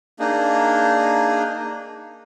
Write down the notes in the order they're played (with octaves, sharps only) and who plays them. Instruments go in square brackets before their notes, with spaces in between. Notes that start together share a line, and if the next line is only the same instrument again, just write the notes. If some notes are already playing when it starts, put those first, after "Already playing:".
[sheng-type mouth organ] A#3 D4 D#4 G#4